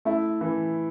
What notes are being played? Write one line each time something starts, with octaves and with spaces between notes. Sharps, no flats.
A3 E4
E3